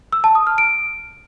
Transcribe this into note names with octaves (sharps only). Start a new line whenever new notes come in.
E6
A5
D#6
F6
D7